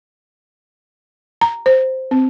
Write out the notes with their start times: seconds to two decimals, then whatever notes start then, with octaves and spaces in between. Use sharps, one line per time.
1.41 A#5
1.66 C5
2.11 C4